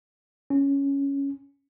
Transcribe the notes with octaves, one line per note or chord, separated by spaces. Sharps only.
C#4